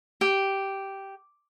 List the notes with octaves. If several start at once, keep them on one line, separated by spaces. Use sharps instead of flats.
G4